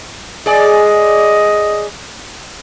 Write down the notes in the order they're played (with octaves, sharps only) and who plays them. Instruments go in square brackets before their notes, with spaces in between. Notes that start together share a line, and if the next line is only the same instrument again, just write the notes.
[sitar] G#4 D5 [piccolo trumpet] D#5